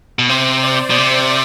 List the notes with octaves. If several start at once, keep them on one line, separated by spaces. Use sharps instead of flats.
B2
C3 C5
D5
B2
C3